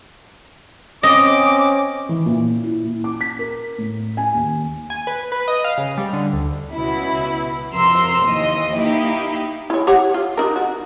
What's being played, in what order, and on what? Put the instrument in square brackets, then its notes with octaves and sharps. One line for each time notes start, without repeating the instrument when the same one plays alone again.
[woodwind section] C4 D6 [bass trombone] C#4 [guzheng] D#5
[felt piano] E3
A#2
E4
A#2
D6
B6
A#4
A2
G#5
D#2
[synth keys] G#5
B4
B4
D#5
F5
C#3
G3
D3
D2
[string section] C#2 B2 E4
F2 C3 A#4 A#5 C6 E6
D#2 E3 D#5
A#3 D#4 E4 G4
[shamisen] E4 C#5
G4 C#5 F#5
F4
D4 D#4 A#4
F#4